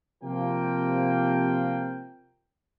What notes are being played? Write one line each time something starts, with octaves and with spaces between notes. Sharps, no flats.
C3 F3 A#3 G5